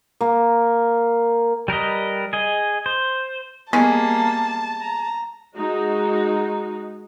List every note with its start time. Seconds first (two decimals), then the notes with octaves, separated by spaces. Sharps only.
0.21 A#3
1.68 G3 A#4 B4 D#5
2.33 G#4 D#5
2.86 C5
3.73 G3 G#3 A#3 B3 C#4 G#4 A5
4.81 A#5
5.55 G#3 D#4 F#4